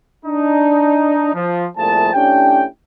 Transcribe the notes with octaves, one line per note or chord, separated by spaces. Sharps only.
D4 D#4
F3
C2 A#2 F3 A3 G#4 A5
A2 C#4 D4 G4 G5